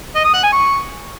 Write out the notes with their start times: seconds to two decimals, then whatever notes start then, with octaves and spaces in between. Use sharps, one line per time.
0.15 D#5
0.24 D#6
0.34 F#5
0.43 G#5
0.52 C#6